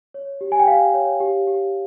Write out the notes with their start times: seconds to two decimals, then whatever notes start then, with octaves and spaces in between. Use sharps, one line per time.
0.14 C#5
0.41 G4
0.52 G#5
0.59 G5
0.68 G4 F5
0.94 C#5
1.20 G4
1.47 G4